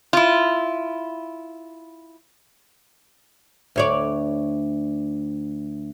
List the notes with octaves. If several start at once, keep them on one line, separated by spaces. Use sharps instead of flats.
E4 F4
D2 C#5 D5